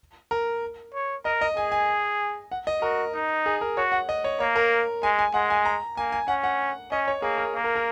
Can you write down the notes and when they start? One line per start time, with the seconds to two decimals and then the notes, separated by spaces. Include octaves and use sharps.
0.31 A#4
0.94 C#5
1.25 A#4 D#5
1.41 D#5
1.56 G#4 G#5
1.72 G#5
2.52 F#5
2.67 D#5
2.82 F#4 A#4
3.14 D#4
3.46 G#4
3.61 A#4
3.77 F#4 C#5
3.92 F#5
4.09 D#5
4.24 C#5
4.40 A#3 C#5
4.56 A#4
5.03 G#3 G#5
5.19 G#5
5.34 G#3 F#5
5.50 G#5
5.65 A#5
5.97 A#3 G#5
6.12 G#5
6.28 C#4 F#5
6.44 F#5
6.91 C#4 D#5
7.08 C#5
7.22 A#3 G#4
7.38 A#4
7.55 A#3
7.64 A#4
7.76 A#4